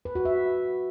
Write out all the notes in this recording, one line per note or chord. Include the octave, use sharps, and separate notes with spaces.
B4
F#4
E5